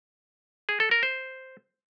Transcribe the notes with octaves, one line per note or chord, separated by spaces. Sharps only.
G#4
A4
A#4
C5